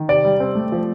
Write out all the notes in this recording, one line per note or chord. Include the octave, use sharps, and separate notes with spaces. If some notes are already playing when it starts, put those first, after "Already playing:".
Already playing: D#3
C3 D5
G3
C4
A3
F3